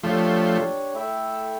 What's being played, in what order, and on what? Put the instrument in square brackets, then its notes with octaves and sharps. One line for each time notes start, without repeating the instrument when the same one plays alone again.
[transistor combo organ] F3 A3 [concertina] D4 G4 C#5
[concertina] A3 E4 A4 E5 G5